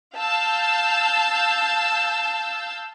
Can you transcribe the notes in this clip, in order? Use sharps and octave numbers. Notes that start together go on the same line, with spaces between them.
F5 A5 E6 G6